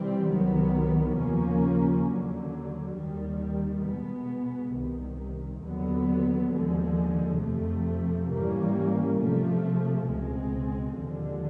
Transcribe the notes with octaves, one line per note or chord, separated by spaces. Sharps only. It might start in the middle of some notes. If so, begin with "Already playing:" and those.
Already playing: C3 E3 G3 C4
C2 C3 D#3 F#3 B3
D#2 C#3 F3 A#3 C#4
D#2 D3 F#3
D#2 D#3 G3
B2 G#3 B3
C2 C3 D#3
D#2 D3 F#3 B3
D#2 D3 F3 G#3
F2 C3 F3 A3
G#2 E3 G3 A#3 C#4
C3 F3 A3
C#2 B2 G#3 C4
D#2 D3 F3 G#3